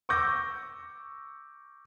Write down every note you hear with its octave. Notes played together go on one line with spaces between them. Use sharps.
C#6 D6 E6 G6 A#6